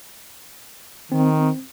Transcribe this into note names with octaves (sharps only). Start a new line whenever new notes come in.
D#3 C4